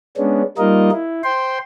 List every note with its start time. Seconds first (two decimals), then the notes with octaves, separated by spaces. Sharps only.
0.17 G#3 B3 C#4 D4
0.58 G3 A#3 D#4 F4 A#4 D#5
0.92 E4
1.24 C5 G5 C6